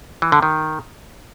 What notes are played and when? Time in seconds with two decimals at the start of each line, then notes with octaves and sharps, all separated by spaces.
0.22 E3
0.32 D3
0.42 D#3